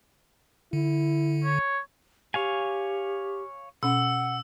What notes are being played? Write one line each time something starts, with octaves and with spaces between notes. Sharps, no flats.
D3 E4
C#5
G4 C#5 F5 G#5
B2 C#4 F#5 E6